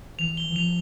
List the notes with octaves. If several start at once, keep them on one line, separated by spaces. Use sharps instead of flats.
E3 F7
G7
E3
F3 F7